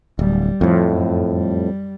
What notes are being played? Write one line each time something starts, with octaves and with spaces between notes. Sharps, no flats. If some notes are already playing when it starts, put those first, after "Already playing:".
D1 G3
F2 A2 F3
F#2
G3